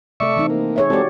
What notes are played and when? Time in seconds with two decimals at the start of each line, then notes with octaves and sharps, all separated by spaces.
0.20 C3 A3 A4 D5 E5 C#6
0.36 E3 C4 D#4
0.50 A#3
0.76 G#4 C#5 E5
0.90 G#3 C4 F#4 G4 A4 D5